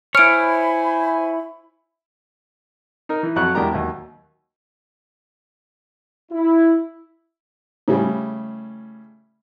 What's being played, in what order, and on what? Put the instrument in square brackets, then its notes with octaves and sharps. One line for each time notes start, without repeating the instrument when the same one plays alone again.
[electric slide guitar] E4 C#5 [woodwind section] C5 G#5 B5 [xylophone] F6 D7
[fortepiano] D#4 A#4
E3
F2 F#3 C#6 F#6
E2 G#3 D4 G4 A#4 A#5
D#2 F#3
[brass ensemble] E4
[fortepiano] A2 C#3 G3